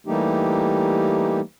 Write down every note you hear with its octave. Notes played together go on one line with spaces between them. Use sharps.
E3 G3 A3 A#3 D#4 G4